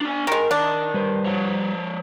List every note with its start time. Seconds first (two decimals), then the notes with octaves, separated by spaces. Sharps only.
0.01 D4 G#5
0.27 D#3 G#3 A#4
0.51 D#3 D4
0.94 G3 B4 C5
1.26 F3 C#5